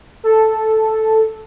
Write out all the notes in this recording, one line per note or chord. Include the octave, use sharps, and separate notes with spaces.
A4